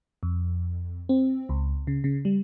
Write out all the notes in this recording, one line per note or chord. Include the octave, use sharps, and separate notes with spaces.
F2
C4
C#2
C#3
C#3
G3